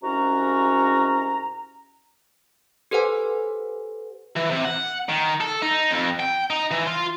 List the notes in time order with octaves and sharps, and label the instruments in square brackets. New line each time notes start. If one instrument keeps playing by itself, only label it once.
[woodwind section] C2 G#2 C#4 F#4 A#5
[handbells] G4 A4 B4 C5 F#5 G#5
[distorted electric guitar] E3
C3
F#5
D#3
A4
D#4
F2
G5
D#4
E3
F4